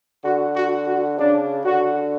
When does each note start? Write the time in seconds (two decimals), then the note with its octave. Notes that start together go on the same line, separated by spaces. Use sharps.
0.24 D3 F#4
0.56 F#4
0.87 F#4
1.19 C#3 D4
1.64 D3 F#4